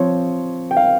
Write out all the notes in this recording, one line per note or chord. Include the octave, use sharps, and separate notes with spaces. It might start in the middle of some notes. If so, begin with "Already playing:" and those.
Already playing: F3 C4 C#5
G5
F5